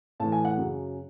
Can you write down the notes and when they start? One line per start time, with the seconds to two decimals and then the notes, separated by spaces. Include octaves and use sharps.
0.20 A2 A5
0.24 E3
0.32 G#5
0.45 F#5
0.57 F#2 C#3 F#3